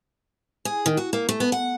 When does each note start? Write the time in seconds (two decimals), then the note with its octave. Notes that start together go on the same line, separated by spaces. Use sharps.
0.65 G#4
0.86 D#3
0.97 F#4
1.13 A#3
1.29 A3
1.40 B3
1.52 F#5